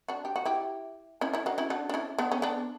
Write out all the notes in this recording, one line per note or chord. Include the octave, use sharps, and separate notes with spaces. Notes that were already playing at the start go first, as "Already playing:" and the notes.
D4 F#4
G4
F#4
E4 G4
C#4 E4
C#4 E4
D4 F#4
C#4 E4
D4 F#4
D4
C#4 E4
B3 D4
C#4
B3 D4